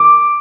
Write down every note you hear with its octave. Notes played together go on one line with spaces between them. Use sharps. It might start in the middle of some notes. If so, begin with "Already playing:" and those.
Already playing: D6